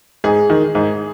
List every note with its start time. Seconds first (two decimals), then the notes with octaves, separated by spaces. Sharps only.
0.24 G#2 G#4
0.50 D#3
0.75 G#2